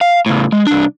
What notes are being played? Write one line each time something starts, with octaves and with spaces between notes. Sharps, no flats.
F5
A2 C#3
G#3
C2 D4